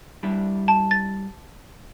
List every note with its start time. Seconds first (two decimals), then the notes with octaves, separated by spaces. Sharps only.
0.23 G3 D4 E4
0.68 A5
0.91 A6